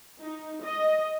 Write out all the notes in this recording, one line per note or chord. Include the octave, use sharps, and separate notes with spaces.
D#4
D#5